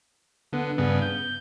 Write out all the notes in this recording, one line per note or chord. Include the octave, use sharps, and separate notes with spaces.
D3 B3
G2 C#3 B3
G6